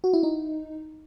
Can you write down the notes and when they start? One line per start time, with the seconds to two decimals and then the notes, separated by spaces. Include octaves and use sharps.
0.04 F#4
0.13 E4
0.23 D#4